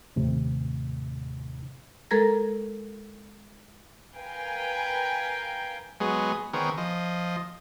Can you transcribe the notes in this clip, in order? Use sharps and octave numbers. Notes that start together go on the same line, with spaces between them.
D#2 A2 C3
G#3 A4 A#4 A#5 G#6 A#6
A#4 B4 F5 G5 G#5
F#3 G#3 B3 G#4
D#3 B3 C4 G#4 A#4 C#5
F3 D#5